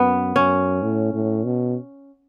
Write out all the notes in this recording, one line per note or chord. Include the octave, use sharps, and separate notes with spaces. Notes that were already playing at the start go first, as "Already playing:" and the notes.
Already playing: F#2 B3
F#2 C#4
A2
A2
B2